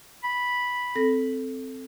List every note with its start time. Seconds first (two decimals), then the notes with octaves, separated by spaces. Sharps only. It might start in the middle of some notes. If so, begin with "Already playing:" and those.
0.24 B5
0.95 C4 A4 A#6